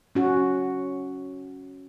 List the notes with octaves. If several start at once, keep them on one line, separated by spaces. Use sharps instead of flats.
C#4 F#4